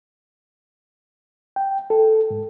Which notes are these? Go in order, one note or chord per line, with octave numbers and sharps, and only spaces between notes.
G5
A4
G#2